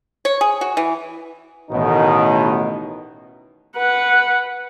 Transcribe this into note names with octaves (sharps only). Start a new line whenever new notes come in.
C#5
G#4
F#4
E3
A1 B2 D#3 D#4
B4 F#5